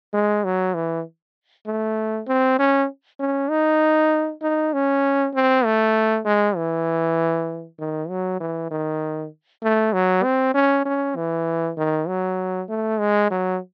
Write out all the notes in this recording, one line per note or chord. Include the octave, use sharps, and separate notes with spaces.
G#3
F#3
E3
A3
C4
C#4
C#4
D#4
D#4
C#4
C4
A3
G#3
E3
D#3
F#3
E3
D#3
A3
F#3
C4
C#4
C#4
E3
D#3
F#3
A3
G#3
F#3